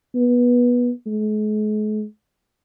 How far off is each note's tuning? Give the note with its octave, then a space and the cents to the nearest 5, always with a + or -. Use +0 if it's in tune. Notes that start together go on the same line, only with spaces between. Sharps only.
B3 -20
G#3 +45